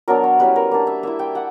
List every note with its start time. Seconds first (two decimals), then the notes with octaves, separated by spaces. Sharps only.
0.08 F#3 B3 D4 A#4
0.24 C#5
0.39 G3 C#4 E4 B4
0.56 A#4
0.71 A#3 D4 B4
0.87 E5
1.03 A#3 E4 E5
1.19 G5
1.35 F#5